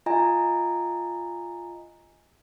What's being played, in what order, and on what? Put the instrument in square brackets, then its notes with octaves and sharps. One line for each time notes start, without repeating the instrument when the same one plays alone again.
[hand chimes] F4 D#5 G#5 A#5